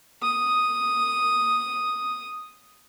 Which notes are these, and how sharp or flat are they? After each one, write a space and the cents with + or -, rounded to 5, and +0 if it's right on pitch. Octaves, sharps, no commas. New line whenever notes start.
D#6 +0